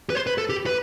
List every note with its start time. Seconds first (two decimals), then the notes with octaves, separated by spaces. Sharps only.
0.10 B4
0.15 C5
0.27 B4
0.38 A4
0.49 G4
0.66 B4